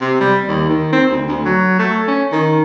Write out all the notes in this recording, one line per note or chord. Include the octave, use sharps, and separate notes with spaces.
C3
G3
D#2
D#3
C4
D2
D2
F#3
A3
C#4
D#3